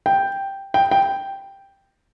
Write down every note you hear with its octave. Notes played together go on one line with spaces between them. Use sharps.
G5
G5
G5